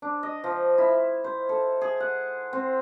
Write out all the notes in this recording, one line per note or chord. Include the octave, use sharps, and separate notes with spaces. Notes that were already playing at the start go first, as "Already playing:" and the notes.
D4
D#5
F3
E4
C5
A4
G#4
F#5
C4